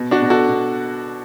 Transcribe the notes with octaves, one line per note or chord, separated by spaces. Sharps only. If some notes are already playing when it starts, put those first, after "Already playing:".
Already playing: B2
D4 F#4
B2
F#4 A4
B2